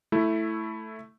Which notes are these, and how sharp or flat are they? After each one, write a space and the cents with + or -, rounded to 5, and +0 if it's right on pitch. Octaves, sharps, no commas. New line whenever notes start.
A3 +0 E4 +0